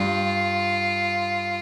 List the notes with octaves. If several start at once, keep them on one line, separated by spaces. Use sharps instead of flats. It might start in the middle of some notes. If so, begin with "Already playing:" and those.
Already playing: G2 F4